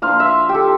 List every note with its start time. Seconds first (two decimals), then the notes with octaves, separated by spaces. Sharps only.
0.02 F3 A#3 D4 F4 F5
0.20 E5
0.49 G4
0.55 A4